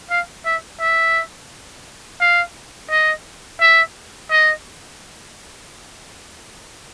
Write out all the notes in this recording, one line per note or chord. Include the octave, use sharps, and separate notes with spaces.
F5
E5
E5
F5
D#5
E5
D#5